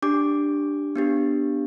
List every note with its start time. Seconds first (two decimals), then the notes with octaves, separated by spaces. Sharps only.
0.02 D4 G4 D6
0.96 B3 D4 G4